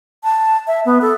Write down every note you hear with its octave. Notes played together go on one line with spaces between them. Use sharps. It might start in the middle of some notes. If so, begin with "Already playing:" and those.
A5
E5
B3
A4